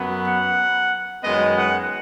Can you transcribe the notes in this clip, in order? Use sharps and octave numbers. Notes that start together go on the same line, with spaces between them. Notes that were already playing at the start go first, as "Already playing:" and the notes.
Already playing: F#2 F#3 B3
F#5
F#2 D#3 G#3 B3 D#5
F#5